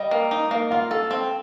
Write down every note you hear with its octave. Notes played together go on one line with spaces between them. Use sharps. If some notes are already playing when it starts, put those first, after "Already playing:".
Already playing: G3 D#5
A#3
D#4
A#3
F4 F5
A4
C4